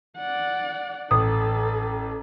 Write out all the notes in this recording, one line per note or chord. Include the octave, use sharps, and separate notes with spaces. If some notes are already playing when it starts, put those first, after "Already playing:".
D5 F#5
A1 A4 D#6